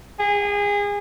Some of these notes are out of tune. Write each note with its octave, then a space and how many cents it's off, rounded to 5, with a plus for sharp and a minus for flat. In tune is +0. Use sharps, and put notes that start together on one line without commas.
G#4 -30